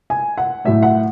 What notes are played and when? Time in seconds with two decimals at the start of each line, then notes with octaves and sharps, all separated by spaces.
0.10 G#5
0.38 F#5
0.65 A2 F#3 A3 E5
0.83 F#5